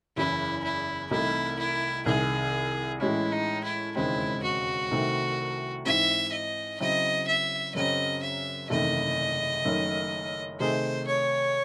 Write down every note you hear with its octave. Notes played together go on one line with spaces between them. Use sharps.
F#1 E2 C#3 E3 E4
E4
C2 C3 E3 A3 D#4 E4
E4
C2 C3 D#3 G#4
A2 E3 G#3 C#4 E4
D#4
E4
E1 D#2 C#3 G#3 C4 E4
F#4
C2 C3 D#3 A3 C4
G#2 E3 C4 E5
D#5
C#3 F#3 C4 E4 D#5
E5
F#2 C#3 F#3 C4 D#5
E5
F#1 E2 C3 D#3 A3 D#5
F#1 F#2 D#3 A3
C3 D#3 A3 D#4 G#4 C5
C#5